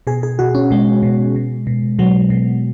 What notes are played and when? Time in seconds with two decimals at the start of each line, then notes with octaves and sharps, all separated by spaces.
0.07 B2 G#4
0.23 G#4
0.39 B2 F#4
0.55 C#4
0.71 B2 G#3
1.02 B2
1.36 B2
1.67 B2
1.99 B2 F#3
2.30 B2